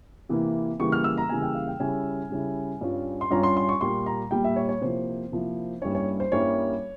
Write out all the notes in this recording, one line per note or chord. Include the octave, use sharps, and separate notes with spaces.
C3 E3 A#3 E4
C#3 E3 G3 A#3 C#6
F6
E6
A#5
C#3 E3 G3 A#3 G#5
G5
F5
G5
C#3 G3 C#4 E4 G#5
C#3 G3 C#4 E4
G2 G3 C#4 F4
C6
G2 G3 C#4 F4 A#5
C6
C6
C#6
A#2 G3 A#3 C6
A#5
A#2 G3 A#3 G5
E5
C#5
C#5
C3 F3 A#3 E4 C5
C3 F3 A#3 E4
G2 G3 A#3 C#4 E4 C#5
C#5
C5
G2 G3 A#3 C#4 E4 C#5